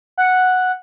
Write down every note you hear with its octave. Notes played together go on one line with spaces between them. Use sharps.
F#5